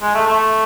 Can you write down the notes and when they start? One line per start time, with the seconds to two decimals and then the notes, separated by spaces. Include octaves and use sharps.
0.02 G#3
0.15 A3
0.27 A3